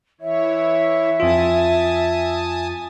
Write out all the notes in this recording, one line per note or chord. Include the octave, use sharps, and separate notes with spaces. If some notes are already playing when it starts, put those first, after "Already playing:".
E3 E4 C#5 E5
F2 F4 G#5 A5 D#6